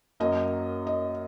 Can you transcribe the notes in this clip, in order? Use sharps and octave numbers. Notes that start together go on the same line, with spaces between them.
F#2 F#3 A#3 D#5
D#5